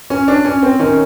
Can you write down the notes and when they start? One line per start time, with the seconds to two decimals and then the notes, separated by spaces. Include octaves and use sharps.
0.10 C#4
0.28 D4
0.45 C#4
0.62 C4
0.79 D#3 C#4